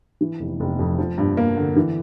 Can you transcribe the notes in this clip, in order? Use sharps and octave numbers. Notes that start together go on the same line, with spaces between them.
E3
F1
F1
F2
F3
G2
A#3
D3
E3